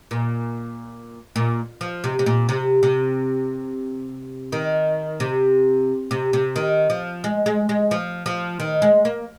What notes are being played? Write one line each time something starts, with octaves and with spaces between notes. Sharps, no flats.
A#2
A#2
F3
C3
C3
A#2
C3
C3
D#3
C3
C3
C3
D#3
F3
G#3
G#3
G#3
F3
F3
D#3
G#3
A#3